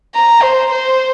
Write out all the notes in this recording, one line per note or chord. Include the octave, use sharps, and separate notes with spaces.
A#5
C5
C5